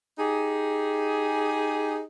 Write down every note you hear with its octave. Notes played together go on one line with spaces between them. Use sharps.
D#4 G4 G#4